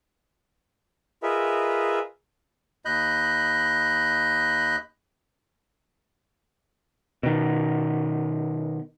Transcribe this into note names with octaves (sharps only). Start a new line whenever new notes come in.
F4 G#4 A#4 B4 D#5 E5
D#2 D#5 B5 F#6 G6
B2 D#3